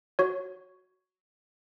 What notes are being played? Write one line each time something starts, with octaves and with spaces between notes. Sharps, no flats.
F#4 C#5